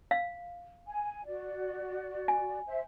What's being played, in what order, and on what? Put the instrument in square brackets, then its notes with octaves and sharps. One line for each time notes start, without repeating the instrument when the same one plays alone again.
[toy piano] F5
[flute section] G#5
F#4 D5
[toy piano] G#5
[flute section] C5 E5